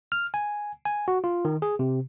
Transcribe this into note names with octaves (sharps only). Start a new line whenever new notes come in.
F6
G#5
G#5
F#4
F4
D#3
G#4
C3